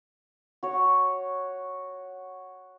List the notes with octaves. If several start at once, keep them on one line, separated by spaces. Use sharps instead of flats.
F#4 C#5